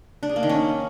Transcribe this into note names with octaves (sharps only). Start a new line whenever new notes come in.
D4
G#4
A#3
D#3
C#4